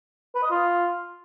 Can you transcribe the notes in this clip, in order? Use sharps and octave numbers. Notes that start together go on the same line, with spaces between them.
B4
D#5
F4